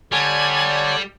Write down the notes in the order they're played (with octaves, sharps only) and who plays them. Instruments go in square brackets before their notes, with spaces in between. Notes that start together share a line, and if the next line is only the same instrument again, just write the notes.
[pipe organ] D3 C#5 D5 [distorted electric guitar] G3 [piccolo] G#5